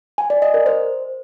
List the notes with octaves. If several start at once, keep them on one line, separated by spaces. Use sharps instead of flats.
G#5
D5
D#5
A#4
C5